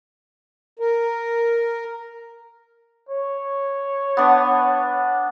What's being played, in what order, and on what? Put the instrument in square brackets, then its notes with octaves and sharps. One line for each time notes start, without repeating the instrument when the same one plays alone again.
[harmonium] A#4
[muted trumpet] C#5
[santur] B3 D4